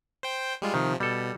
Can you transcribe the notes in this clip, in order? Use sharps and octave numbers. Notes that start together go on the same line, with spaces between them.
C5 G5
G3 G#3 F4
C3 D#3 F3
B2 G3 A4